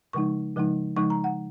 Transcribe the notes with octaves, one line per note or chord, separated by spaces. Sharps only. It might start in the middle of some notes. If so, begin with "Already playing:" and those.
C#3 F3 G#3 D#4 C#6
C#3 F3 G#3 D#4
C#3 F3 G#3 D#4 C#6
A#5
F#5